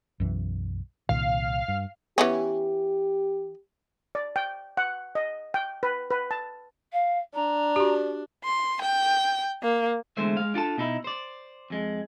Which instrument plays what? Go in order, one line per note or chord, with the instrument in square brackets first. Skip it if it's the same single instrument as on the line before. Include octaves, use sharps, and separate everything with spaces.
[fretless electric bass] B1 F#2 E3
[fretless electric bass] C2 A#2 D#3 [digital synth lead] F5
[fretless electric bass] G2
[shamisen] E3 B3 C#4 [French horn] G4
[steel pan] D5
G5
F#5
D#5
G5
B4
B4
A5
[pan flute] F5
[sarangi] D4 [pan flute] A#5
[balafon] F#4 G4
[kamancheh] C6
G5
A#3
[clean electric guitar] E2 D3 G#3 A3 C5 E5
G#3 F5
D4 F4 A4 A5
B2 D#4 E4
C5 D5
F2 G#3